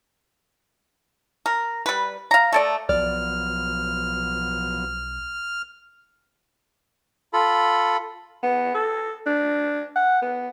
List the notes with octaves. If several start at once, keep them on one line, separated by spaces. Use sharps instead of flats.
A#4
G3 B4
F5 A#5
A3 A4 D5
B1 F3 F#3 B3 D5 F6
F4 A4 B5
B3
A4
D4
F#5
B3